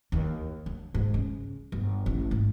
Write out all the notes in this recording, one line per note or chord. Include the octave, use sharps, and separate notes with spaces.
D#2
D3
G#2
C#3
G1
A1
G#1